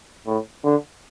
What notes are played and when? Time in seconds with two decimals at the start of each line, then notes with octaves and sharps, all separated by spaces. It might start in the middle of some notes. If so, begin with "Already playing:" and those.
0.27 A2
0.64 D3